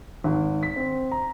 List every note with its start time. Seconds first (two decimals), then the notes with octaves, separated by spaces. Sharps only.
0.24 G#1
0.63 B6
0.76 C4
1.12 A#5